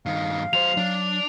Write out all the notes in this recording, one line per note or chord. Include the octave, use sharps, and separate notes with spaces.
G2 D#3 F5
F#3 C5 F7
F#3 D4